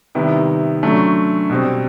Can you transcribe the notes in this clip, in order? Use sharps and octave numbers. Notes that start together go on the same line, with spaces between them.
C3 D#3 G3 B3 E4
D3 F#3 A3 C#4
B2 G3 C4